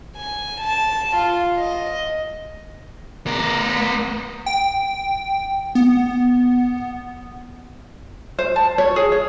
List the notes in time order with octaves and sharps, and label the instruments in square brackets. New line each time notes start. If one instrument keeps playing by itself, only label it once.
[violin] G#5
A5
F4
D#5
[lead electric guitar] B3 A#4
[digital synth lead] G5
B3
[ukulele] C5
A5
C#5
G#4
C#5